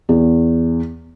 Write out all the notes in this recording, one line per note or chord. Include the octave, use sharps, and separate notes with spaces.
E2